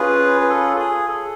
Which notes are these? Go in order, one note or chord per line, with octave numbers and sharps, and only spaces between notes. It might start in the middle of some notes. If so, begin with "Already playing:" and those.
Already playing: C#4 F4 G#4 B4
B4
A4
G#4
A4